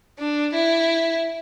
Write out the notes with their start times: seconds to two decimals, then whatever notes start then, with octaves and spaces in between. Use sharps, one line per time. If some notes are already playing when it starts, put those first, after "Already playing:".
0.19 D4
0.54 E4